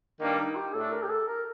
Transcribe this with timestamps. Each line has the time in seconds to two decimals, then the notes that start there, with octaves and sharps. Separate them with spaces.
0.21 G2 D#3 G3 A#3 D4
0.39 D#4
0.57 G4
0.74 A2 A3 D4 A4
0.92 A#4
1.03 G4
1.10 A4
1.28 A#4